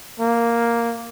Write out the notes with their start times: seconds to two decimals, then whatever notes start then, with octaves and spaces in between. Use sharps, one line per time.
0.20 A#3